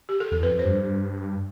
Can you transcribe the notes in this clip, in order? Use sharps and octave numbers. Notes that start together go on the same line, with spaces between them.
G4
A4
E2 A4
F2 B4
F2 C5
G2